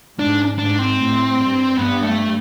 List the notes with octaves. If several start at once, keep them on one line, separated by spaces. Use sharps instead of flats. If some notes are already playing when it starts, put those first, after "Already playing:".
G#2 D4
G#2 D4
C4
A2
G2
G2 B3
A3